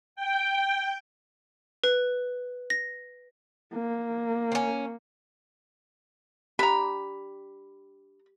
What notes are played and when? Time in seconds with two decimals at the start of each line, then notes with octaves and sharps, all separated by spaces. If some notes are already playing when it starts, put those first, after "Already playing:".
0.16 G5
1.84 B4
2.70 A#6
3.73 A#3
4.52 C4 C#4
6.59 D4 G4 A#5 B5